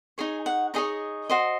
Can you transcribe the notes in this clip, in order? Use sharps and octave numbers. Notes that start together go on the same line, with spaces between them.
D#4 G#4 C#5 G#5
F#5
D#4 G#4 C#5 D#5
F#4 C5 D#5